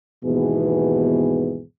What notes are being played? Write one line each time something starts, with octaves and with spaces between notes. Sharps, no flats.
D#2 G#2 B2 E3 B3 G#4